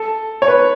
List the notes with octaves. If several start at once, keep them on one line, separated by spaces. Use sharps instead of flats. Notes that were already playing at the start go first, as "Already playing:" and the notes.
Already playing: A4
C#5
B4